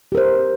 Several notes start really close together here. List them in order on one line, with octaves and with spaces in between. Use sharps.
G4 A#4 C5